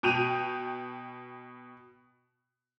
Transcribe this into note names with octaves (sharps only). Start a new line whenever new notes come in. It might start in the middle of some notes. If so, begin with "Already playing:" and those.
B2 G5 D#7 F7